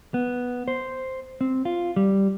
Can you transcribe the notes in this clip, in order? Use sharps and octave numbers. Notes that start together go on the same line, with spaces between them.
B3
C5
C4
F4
G3